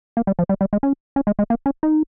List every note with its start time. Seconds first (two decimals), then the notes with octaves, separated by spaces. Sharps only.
0.17 A#3
0.27 G3
0.39 F3
0.49 G3
0.61 G3
0.73 G#3
0.83 C#4
1.16 C#4
1.27 G#3
1.39 G#3
1.50 A#3
1.66 C#4
1.83 D#4